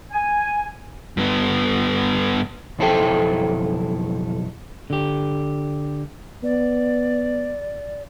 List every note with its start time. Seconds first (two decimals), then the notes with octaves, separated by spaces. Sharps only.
0.12 G#5
1.17 G2 B3
2.79 B1 F2 E4 A4 C5 G5
4.90 D3 G4
6.44 B3 D5